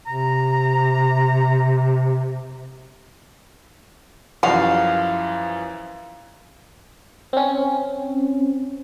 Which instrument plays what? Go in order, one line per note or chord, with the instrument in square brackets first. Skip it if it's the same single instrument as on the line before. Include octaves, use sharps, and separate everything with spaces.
[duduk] C3 [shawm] A#5
[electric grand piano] F#2 E3 F3 [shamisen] G3 F#4 [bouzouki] F5
[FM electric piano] C4 C#4